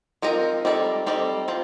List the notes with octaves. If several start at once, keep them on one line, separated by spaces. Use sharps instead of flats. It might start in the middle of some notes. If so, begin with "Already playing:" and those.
F3 C4 D#4 A#4
G3 C4 D#4 A4 D5
G3 C4 D#4 A4 D5
C4 F4 C5